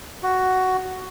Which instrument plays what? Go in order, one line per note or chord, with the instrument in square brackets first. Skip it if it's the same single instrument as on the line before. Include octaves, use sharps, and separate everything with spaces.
[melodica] F#4